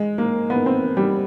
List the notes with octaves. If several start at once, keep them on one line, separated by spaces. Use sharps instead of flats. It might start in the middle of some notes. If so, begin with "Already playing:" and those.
Already playing: G#3
A#3
B3
C4
G3